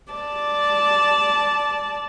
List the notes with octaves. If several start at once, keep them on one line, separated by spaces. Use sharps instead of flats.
D5 A5